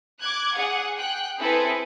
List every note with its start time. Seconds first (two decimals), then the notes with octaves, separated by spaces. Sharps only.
0.21 D6 F#6 G#6
0.53 G#4 F#5
0.97 G5 F#6
1.40 C4 E4 G#4 A4 B4